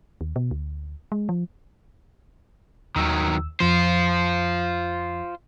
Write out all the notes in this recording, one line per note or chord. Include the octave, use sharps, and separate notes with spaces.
D#2
B2
D2
G#3
F3
D#2 D#3 F#3 E6
F2 F3 F4 C5